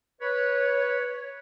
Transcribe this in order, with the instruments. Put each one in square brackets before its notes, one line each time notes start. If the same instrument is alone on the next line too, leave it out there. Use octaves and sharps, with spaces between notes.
[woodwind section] B4 C#5